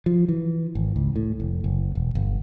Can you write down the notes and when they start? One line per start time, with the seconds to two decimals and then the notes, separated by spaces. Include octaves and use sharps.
0.06 F3
0.28 E3
0.75 G#1
0.96 C#2
1.16 A2
1.40 F1
1.64 F#1
1.95 E1
2.15 G1